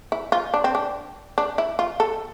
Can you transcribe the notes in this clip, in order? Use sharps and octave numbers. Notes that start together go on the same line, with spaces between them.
E4
F4
D4
C4
D4
D4
E4
F4
A4